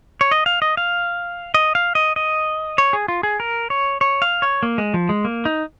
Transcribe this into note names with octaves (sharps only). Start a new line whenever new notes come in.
C#5
D#5
F5
D#5
F5
D#5
F5
D#5
D#5
C#5
G#4
F4
G#4
A#4
C#5
C#5
F5
C#5
A#3
G#3
F3
G#3
A#3
D#4